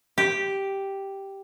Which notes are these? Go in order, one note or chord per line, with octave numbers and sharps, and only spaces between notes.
G4